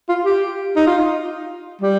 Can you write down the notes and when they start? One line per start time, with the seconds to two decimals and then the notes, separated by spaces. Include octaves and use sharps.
0.09 F4
0.25 G4
0.77 D#4
0.87 F4
1.82 G3